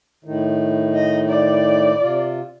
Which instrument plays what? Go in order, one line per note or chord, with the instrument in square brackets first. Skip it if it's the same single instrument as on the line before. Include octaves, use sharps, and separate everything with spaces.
[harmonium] A2 D#3
[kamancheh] D#5
D5
[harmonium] C3 F4